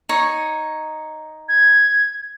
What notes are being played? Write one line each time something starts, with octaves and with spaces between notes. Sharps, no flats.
D#4 C#5
G#6